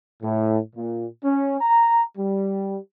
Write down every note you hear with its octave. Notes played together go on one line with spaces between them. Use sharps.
A2
A#2
C#4
A#5
G3